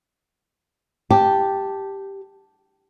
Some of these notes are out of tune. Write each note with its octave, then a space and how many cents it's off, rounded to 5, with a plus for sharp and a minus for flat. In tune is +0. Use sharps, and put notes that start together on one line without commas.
G4 +0 A5 +0